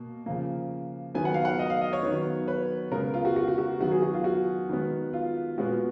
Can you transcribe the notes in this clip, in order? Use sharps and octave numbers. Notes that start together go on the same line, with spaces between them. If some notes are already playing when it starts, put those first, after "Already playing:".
Already playing: B2 A#3
C#3 F3 A#3
D#3 F#3 B3 G#5
F#5
F5
F#5
D#5
F5
D#5
C#5
D#3 F#3 B3
B4
C#3 G#3 B3 A#4
F4
F#4
F#4
F#4
F#4
D#3 F#3 B3 F#4
G#4
F#4
F4
F#4
D#3 G#3 B3
F4
A#2 G#3 B3 F#4